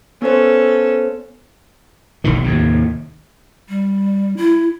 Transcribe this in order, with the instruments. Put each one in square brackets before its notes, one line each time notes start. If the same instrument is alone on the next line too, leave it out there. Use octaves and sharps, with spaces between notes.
[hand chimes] B3 C5 [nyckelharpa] C#4 A4
[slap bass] E1 B1 D3 D#3
D#2 A2 C3
[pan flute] G3
E4